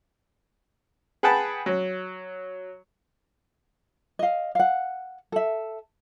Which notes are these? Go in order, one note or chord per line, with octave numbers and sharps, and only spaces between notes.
G#4 B4 F#5 G5 A5 B5
F#3
D#5 F5
F5 F#5
A4 E5